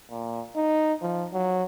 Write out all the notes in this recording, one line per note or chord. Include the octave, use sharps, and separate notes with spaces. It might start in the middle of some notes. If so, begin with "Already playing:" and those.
A#2
D#4
F3
F#3